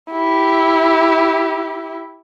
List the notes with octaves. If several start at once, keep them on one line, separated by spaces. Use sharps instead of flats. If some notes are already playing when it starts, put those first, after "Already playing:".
E4 G4